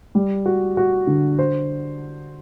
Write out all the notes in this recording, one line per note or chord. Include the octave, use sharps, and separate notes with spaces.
G3
F#4
F#4
D3
C5